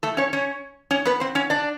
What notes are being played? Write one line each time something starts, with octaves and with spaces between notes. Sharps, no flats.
A3 A4
C#4 C#5
C#4 C#5
C#4 C#5
B3 B4
C4 C5
C#4 C#5
D4 D5